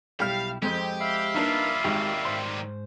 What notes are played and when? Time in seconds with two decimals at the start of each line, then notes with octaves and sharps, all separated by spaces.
0.20 B1 G3 E4 G4 F5 F6
0.62 F2 G#3 C4 G4 C5 D#5
1.00 E5 F5 B5
1.35 G3 A#3 D4 D#4 F4 A#4 B4
1.84 G#1 D#3 G3 G#3 G4
2.25 G#2 C5 C6